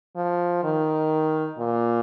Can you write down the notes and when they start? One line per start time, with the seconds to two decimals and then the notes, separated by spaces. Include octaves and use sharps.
0.16 F3
0.64 D#3
1.58 A#2